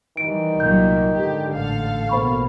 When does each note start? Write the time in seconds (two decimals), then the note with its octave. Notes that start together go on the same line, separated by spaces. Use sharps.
0.17 D#3 E3 G3 D7
0.60 C2 A#2 F#3 A#3 G6
1.13 G#2 D3 G4
1.52 A1 A4 F5
2.09 A#1 B2 A#3 C5 B5 C#6